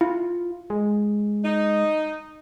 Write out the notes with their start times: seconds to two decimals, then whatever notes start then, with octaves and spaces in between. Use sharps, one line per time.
0.01 E4 F4
0.70 G#3
1.44 D#4